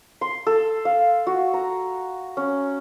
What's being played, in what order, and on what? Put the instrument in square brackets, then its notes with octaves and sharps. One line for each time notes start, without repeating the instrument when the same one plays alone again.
[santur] C6
A4
F5
F#4
A#5
C#4